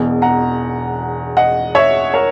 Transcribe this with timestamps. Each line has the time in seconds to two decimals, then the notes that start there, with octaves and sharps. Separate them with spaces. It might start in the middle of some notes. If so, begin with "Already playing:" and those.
Already playing: E1 E2 B2
0.22 F#5 A#5
1.37 D#5 F#5
1.75 C#5 E5
2.14 A#4 C#5